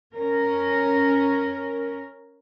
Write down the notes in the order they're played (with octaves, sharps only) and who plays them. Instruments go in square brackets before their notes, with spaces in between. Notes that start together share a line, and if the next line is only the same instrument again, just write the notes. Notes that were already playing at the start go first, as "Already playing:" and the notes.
[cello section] C#4 A#4